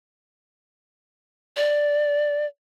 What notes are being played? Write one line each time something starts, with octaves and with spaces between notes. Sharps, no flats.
D5